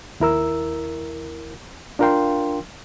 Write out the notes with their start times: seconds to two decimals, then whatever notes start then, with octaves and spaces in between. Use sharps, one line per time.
0.20 D#2 E4 A#4 E6
1.99 D4 F4 A#4 F5 G5 C6